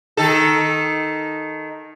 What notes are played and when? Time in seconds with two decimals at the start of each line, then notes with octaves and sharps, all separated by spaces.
0.17 D#3 A4